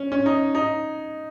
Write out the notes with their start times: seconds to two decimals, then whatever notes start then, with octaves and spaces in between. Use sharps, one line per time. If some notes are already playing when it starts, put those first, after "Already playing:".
Already playing: C#4
0.12 C#4
0.26 D#4
0.55 D#4